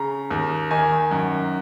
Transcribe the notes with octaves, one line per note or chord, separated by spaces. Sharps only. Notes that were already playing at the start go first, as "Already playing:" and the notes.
Already playing: C#3 A#5
D#2
D#3 G#5
F#2